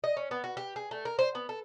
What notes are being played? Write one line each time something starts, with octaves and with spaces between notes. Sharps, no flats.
D#5
C#4
B3
F#4
G4
G#4
A3
A#4
C5
B3
A4